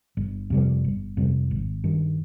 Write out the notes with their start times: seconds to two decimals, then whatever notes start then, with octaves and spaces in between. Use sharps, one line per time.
0.17 G1
0.50 F2 C3 G3
0.84 G1
1.17 F2 C3 G3
1.51 G#1
1.84 G2 D#3